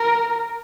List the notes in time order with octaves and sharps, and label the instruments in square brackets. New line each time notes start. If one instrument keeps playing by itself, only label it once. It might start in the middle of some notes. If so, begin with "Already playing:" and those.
Already playing: [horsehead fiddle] A#4